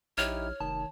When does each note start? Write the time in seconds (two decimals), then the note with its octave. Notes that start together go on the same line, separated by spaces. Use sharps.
0.18 A#1 D#4 E4 G4 C#5 F6
0.60 F1 D#3 A5